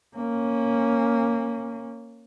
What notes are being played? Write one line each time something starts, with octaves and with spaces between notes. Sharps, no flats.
A#3 C#4